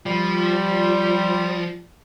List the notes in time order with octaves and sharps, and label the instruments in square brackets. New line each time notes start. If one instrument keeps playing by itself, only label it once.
[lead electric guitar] F3 [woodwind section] G3 F4